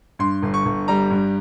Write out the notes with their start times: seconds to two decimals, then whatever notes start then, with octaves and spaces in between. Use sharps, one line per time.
0.19 G2 C6
0.43 G1
0.54 C#6
0.65 G1
0.88 G3 A#5
1.11 G2